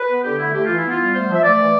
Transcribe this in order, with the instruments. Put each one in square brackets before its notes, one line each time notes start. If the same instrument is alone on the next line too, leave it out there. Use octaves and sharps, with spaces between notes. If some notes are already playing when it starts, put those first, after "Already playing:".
Already playing: [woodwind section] B4
B3
D3 G4
A3 E4
A3 G4
E3 F4
E4
B3
F4
G3
A3 C5
F3 E5
A3 D5
E3